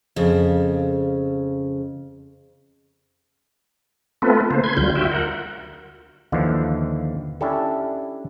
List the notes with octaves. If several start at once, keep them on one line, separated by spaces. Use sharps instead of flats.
F2 C#3
A3 B3 C4 F4 A4 B4
C#3 A#3 C5
B4 C6 G#6
D2 D3 F#3 G3 F4 G6
F4 F#4 E5 G5
A#4 F#5
D#2 D3 E3 F3
C#4 D4 E4 G4 A4